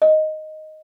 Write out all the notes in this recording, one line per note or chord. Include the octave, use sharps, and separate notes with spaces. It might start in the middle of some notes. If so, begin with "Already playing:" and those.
D#5